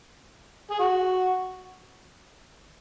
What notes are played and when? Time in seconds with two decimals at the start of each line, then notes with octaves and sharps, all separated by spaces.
0.71 G#4
0.80 F#4